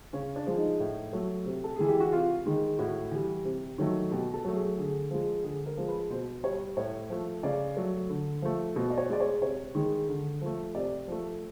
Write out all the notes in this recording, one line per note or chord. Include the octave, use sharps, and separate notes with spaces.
C#3 C#4
D4
F3 G#3
D#4
A2
F#3 A3
C3
A4
E3 G#3 G#4
G4
F#4
C3 F4
D#3 G#3
A2 F#4
E3 G3
C3
D#3 F#3 A3
B2 G4
A4
F#3 A3
G#4
D3 G#4
F3 G#3
D3 G#4
A#4
F3 G#3
B4
B2 C5
G3 C#5
A2 C#5
F3 A3
C#3 D5
F#3 A3
D3
F3 A3
B2 C5
D5
C#5
G#3 D5
C#5
C3 C#5
D#3 G#3
D3
F3 A3
C3 D5
F3 A3